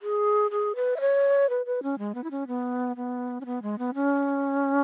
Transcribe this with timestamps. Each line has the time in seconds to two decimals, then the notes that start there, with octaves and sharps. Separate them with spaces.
0.02 G#4
0.51 G#4
0.76 B4
0.96 E5
1.01 C#5
1.49 B4
1.66 B4
1.83 C#4
1.99 G#3
2.15 B3
2.24 E4
2.31 C#4
2.47 B3
2.96 B3
3.41 C#4
3.46 B3
3.62 G#3
3.79 B3
3.94 C#4